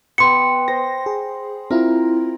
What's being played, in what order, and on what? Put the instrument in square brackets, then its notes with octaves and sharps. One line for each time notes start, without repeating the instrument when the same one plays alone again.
[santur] B3 B4 G5 [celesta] C6 C#7
[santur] C5 [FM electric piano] A#6
[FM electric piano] G#4
[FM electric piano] C4 E4 F4 [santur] A#4